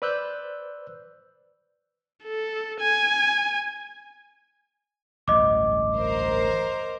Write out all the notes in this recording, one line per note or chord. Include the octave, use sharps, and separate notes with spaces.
B4 C5 D5 E6 F#6 G6
A4
G#5
A1 D2 G2 D#5 D6
A#4 C5